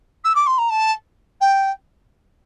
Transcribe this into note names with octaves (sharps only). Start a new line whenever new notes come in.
E6
D6
C6
A#5
A5
G5